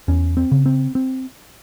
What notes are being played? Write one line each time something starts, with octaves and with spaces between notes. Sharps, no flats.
E2 C#4
C4
C#3
C4
C4